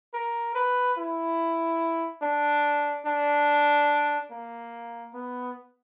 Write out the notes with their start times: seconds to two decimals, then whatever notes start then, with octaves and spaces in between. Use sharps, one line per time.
0.14 A#4
0.55 B4
0.98 E4
2.22 D4
3.06 D4
4.31 A#3
5.14 B3